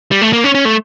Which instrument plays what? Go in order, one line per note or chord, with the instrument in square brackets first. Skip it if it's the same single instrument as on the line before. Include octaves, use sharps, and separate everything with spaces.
[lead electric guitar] G3
A3
A#3
C#4
C#4
A3